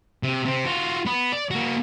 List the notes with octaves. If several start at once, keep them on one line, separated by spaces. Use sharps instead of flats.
C3
C3 C4
F4 F#4
B3
D5
A#3 F#4